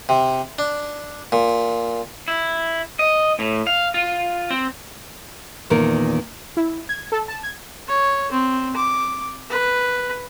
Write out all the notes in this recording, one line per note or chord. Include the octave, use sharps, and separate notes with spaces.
C3
D4
A#2
E4
D#5
A2
F5
F4
C4
E2 A#2 D#3 A#4
E4
G#6
A4
A5
G#6
C#5
C4
D6
B4